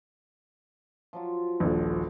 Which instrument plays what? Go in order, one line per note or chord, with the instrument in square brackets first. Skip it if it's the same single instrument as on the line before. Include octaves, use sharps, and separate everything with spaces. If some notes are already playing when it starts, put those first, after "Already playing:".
[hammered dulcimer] F3 F#3 F4
[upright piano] D#1 A#1